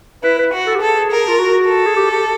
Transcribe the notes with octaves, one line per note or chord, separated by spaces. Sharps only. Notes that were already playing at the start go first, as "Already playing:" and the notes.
E4 B4
B4
F#4
A4
G4
G#4 A4
A#4
F4
F#4
A4
G#4
G4
G4